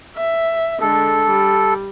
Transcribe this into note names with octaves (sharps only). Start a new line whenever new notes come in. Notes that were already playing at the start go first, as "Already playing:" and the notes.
E5
D3 G#3 A4
G3